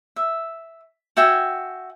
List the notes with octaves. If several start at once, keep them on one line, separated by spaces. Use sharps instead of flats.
E5
F#4 E5 G5 G#5